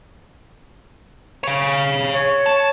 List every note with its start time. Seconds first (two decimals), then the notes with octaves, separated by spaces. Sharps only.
1.44 C#5 F5
2.13 C#5
2.46 A5